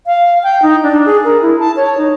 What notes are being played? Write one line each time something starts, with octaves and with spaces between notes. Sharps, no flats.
F5
G5
D#4
D4
G#4
A#4
E4
A5
C#5
D#4